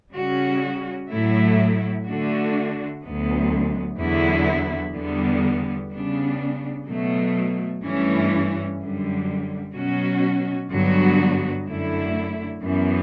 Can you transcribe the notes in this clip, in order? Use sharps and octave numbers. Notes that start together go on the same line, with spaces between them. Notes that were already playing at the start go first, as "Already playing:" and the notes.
C#3 G3 C#4 F#4
A2 F#3 A3 E4
D3 A3 D4 F#4
D2 D3 F#3 B3
E2 D3 F#3 B3 E4
E2 D3 G3 B3
C#3 G3 B3 D4
B2 F#3 A3
G2 E3 A3 C#4
F#2 D3 G3
B2 F#3 C#4 F#4
G2 D3 F#3 B3 F#4
F#2 D3 A3 E4
F#2 E3 B3